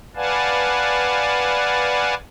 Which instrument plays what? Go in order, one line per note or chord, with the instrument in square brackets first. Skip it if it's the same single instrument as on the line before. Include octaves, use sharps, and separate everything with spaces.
[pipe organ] B4 D5 F5 F#5 G#5 A5